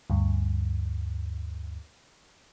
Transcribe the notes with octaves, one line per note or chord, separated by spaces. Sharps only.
D2 G2